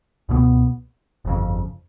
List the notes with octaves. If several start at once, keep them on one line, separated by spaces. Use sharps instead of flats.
C#2 B2 G#3 B3
G1 F2 C#3